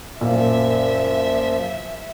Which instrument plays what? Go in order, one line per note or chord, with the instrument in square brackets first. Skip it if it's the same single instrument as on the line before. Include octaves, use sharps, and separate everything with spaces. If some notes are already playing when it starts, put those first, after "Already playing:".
[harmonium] F#2 F3 [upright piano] A#2 [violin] E5